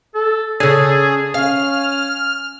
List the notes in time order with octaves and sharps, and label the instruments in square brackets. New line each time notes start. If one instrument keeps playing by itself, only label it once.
[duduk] A4
[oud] C#3 D4 [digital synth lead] G#4 [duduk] A4
[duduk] C#4 [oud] F5 [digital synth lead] F6